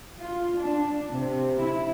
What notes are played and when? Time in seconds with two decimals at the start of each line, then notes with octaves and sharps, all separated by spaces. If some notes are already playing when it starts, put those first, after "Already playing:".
0.21 F4
0.59 D4
1.11 C3
1.61 E4